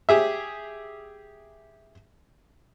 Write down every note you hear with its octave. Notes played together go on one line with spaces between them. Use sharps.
G4 G#4 E5